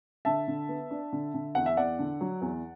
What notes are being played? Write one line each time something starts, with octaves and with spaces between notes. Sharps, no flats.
D3 E5 A5
D3
B3
D4
D3
D3
E2 F#5
E5
E2 D5 F#5
D3
F#3
E2